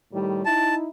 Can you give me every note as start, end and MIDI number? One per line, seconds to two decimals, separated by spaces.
0.13 0.43 45
0.13 0.43 51
0.13 0.43 55
0.45 0.88 63
0.45 0.88 64
0.45 0.75 81